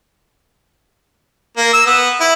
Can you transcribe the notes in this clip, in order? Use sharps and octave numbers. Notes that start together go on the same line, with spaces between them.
A#3
E6
B3
E4